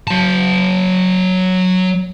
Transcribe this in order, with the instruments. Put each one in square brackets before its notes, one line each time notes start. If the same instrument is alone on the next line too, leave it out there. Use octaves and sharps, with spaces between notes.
[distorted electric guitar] F#3 A5